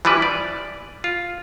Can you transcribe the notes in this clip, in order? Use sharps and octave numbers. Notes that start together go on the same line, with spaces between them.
E3 F3 G3 E4 B4
D5
F4